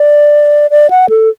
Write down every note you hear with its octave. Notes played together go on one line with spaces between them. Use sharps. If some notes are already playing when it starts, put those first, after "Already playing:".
Already playing: D5
D5
F#5
A4